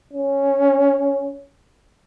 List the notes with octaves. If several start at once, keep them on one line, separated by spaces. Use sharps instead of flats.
C#4